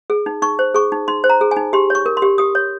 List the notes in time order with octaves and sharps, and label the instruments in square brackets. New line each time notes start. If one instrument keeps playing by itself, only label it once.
[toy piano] G#4
D#4
D#4 C#6
C5
G#4 C#6
D#4
D#4 C6
C5
A#5
G#4
G#5
D#4
G4 C6
C#5 C#6
A#4
C6
G4
G4 D#6
C#5